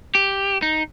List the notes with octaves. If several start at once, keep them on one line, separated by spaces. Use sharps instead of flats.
G4
D#4